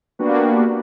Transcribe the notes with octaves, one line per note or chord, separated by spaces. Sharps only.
A#3 B3 D4 F#4 G4 B4